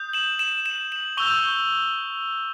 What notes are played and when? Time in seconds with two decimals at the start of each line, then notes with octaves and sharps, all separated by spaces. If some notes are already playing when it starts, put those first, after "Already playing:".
Already playing: D#6 G6
0.13 E7 F#7
0.39 E7 F#7
0.66 E7 F#7
0.92 E7 F#7
1.17 C#6 E6 G6 F7 G7